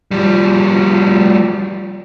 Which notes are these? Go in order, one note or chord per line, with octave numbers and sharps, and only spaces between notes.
F3 G3